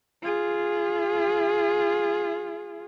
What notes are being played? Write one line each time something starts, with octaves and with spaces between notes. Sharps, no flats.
F4 G#4